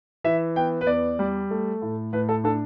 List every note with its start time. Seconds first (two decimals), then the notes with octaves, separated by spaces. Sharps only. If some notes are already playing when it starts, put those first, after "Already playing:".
0.24 E3 E5
0.56 B3 G5
0.81 B4
0.87 E2 D5
1.19 G3
1.51 A3
1.82 A2
2.13 A2 B4
2.29 A4
2.44 D4 A4